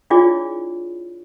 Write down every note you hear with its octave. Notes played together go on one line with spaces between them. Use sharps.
D4 E4 F4 G#4 C#5 D5